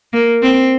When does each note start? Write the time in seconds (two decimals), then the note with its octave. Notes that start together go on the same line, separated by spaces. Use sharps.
0.13 A#3
0.42 C4